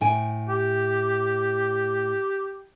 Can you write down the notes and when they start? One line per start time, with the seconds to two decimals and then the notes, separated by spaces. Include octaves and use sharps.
0.01 A2 G5 G#5
0.49 G4